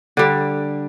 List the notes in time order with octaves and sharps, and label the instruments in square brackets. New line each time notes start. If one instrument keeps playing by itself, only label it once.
[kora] D3 G3